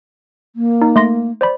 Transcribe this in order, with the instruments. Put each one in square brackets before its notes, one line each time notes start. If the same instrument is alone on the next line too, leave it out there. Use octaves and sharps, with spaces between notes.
[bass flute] A#3
[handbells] D#4
A3 C6 A#6
C5 D5 B5